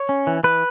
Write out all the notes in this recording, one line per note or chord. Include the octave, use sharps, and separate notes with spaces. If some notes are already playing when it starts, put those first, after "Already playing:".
Already playing: C#5
C#4
E3
E3 B4